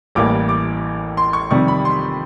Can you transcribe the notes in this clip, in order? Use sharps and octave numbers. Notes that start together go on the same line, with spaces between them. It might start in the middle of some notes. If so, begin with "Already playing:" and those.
A1 A2 E3 G3 A#3 D6
D6
C6
C#6
F2 C3 D#3 G3 C#6
B5
C6